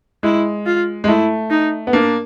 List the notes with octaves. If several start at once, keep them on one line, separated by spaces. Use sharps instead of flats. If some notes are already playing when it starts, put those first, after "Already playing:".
G#3 E4
F4
G#3
A3 E4
D#4
B3
A#3 D4